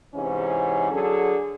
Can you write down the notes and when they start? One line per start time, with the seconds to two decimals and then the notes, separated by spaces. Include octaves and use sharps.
0.14 G#2 C3 E3 C#4
0.91 D3 F#3 G#4 A4